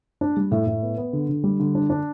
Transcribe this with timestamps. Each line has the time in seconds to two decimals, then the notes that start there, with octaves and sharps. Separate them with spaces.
0.21 D4
0.37 G3
0.51 A2
0.67 A2
0.82 B3
0.97 B3
1.13 D3
1.29 D3
1.44 G3
1.60 D3
1.75 D4
1.90 D4